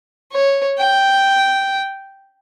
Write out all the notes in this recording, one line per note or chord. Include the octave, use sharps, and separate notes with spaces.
C#5
G5